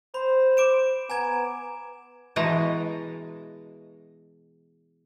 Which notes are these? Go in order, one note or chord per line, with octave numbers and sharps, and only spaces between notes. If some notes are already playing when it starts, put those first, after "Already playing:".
C5 B5
D6 D7 E7
B3 G#5 A#5 G#6
B2 E3 G#3 F#4 A5 A#5